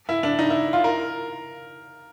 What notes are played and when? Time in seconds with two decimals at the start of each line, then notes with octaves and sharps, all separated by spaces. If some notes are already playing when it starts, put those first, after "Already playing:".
0.09 E4
0.23 D4
0.39 D#4
0.50 E4
0.73 F4
0.84 A#4